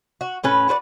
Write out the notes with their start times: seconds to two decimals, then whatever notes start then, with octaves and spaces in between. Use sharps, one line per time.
0.21 F#4
0.44 A2 C#4 B4
0.68 F#4 B4 C5 D5